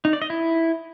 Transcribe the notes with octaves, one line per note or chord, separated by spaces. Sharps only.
D#4
D5
D#5
E4